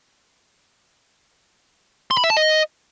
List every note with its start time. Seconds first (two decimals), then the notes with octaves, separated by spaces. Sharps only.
2.11 C6
2.17 B5
2.24 E5
2.30 A5
2.37 D#5